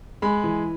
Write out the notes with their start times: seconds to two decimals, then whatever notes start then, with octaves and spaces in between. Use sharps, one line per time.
0.22 G#3 B5
0.44 E3